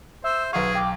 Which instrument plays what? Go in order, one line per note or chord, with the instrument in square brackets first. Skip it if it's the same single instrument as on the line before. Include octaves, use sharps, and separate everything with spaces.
[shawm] C5 [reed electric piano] E5 [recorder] E6
[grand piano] B1 F5 [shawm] G#4 [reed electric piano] B4 C#6 [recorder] F#5
[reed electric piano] G5 [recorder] D6